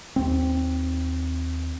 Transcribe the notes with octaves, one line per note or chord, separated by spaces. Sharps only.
D#2 C4